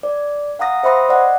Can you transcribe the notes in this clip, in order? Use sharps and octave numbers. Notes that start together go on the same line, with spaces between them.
D5
F5 F#5 A#5 D#6 A#6
C5 E5 B5 C6 D#6 A#6
D5 D#5 F#5